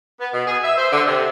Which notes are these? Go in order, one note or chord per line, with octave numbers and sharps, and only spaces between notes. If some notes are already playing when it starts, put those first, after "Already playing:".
B3
B2
G#4
E5
C5
D3
C3